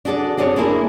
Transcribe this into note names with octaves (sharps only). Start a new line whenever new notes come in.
D4 F#4 G#4 A4 C#5 D5
C4 D4 G#4 A4 C#5
G#3 A#3 D4 E4 G#4